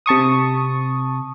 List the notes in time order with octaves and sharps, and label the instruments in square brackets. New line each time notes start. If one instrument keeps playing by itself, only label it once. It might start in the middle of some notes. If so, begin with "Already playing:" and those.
[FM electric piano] C3 A5 C#6 D#6